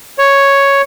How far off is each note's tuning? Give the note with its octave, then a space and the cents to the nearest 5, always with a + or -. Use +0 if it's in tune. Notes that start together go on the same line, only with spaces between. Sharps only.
C#5 +0